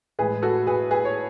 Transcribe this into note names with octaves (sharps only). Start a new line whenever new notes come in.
A2 E3 G#3 G#4 B4
F#4 A4
G#4 B4
G#4 B4
C#5